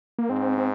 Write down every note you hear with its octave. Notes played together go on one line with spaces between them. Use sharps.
A#3
G#2 C4
C4